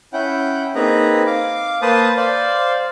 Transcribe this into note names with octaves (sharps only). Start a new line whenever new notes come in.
C#4 E4 F#5 G5
A#3 C4 D#4 G#4 B4 A#5
F5 D6
A#3 B4 C5 F5 A5 D#6
C5 D5 F5